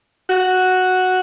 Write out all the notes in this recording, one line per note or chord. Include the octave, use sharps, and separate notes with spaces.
F#4